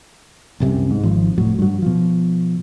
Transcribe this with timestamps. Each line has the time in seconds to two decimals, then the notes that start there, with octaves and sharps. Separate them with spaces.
0.60 C2 F#2 C3
0.91 G#2
1.03 G#1 F3
1.38 F1 A2 F#3
1.59 G2 F#3
1.82 B2 F3